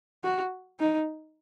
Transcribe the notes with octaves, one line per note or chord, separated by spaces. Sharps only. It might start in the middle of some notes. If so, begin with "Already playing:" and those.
F#4
D#4